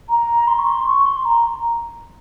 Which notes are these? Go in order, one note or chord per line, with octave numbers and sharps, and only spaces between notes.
A#5
C6
C#6
C6
C#6
C6
A#5